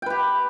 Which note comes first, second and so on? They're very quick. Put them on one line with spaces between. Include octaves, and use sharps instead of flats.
G5 B4 G4